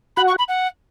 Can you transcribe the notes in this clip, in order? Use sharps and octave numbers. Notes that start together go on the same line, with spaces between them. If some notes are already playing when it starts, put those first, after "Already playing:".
F#4 F#5 B5
C#6
B5
F#5